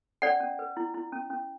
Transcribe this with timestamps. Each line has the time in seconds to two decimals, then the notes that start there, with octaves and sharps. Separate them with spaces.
0.22 C#4 D5 F#5
0.40 C#4
0.59 B4
0.77 E4
0.94 E4
1.12 C#4
1.30 C#4